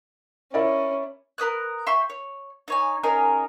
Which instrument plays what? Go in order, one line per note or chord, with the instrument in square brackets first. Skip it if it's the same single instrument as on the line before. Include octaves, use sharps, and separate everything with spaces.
[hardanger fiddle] C#4 [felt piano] E4 A#4 D5
[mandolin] A#4 B4 D#6 F#6
E5 G5 C6 C#6
C#5
D#4 C#5 G#5
C#4 D#4 G#4 A#4